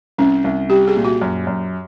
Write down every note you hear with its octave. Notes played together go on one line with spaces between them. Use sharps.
C2 C#4
C2
G3 G4
G#4
A#2
F#4
F#2
F#2